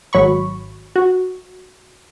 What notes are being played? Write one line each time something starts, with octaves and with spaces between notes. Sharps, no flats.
G#1 F#3 B5 C#6
F#4